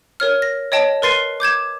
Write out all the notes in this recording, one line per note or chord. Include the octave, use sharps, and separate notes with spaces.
A#4 C#5 F6
A#6
C#5 D#5 G5 A5
A#4 B4 C6 A6 C7 D#7
D6 G6 G#6 E7